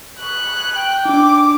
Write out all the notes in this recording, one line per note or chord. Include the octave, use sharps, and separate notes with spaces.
G#4 B4 C#6 F#6
G5
D4 D#4 D6